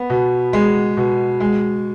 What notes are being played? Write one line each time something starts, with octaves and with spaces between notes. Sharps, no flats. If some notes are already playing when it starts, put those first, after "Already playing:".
Already playing: B3
B2
G#3
B2
G#3